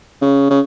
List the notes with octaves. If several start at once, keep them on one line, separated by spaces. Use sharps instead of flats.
C#3
C#3